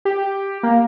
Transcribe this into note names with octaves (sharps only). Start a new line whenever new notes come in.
G4
A#3